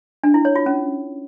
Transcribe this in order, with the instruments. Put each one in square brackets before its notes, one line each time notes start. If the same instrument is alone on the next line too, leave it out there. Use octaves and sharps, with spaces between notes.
[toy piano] D4
E4
C#5
F4
C#4